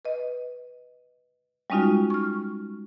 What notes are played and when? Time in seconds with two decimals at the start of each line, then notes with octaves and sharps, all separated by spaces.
0.05 B4 D#5
1.70 G3 G#3 C#4 D#4 F4 F#4
2.10 C#6 F6